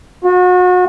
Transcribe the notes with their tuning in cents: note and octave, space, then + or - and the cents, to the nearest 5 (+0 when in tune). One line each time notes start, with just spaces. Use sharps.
F#4 -35